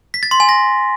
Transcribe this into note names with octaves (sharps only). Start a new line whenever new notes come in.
B6
A6
C6
G#5
A#6